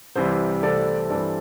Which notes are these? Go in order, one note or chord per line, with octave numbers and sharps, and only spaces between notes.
C2 C3 E3 G3 C5
C2 C3 E3 A3 C4 A4 D5
G2 E3 G3 C4 A4 D5